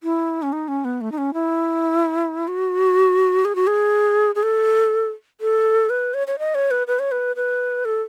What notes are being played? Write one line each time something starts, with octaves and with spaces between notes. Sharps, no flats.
E4
C#4
D#4
C#4
B3
A3
D#4
C#4
E4
F#4
G#4
F#4
G#4
G#4
A4
A4
B4
C#5
C#5
D#5
C#5
B4
B4
C#5
B4
B4
A4